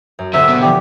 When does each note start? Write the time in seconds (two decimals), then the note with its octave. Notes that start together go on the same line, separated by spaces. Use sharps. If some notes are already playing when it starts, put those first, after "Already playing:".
0.19 F#2
0.34 G#1 D2 C3 E5 F#6
0.48 B2
0.62 D3 E3 F3 G4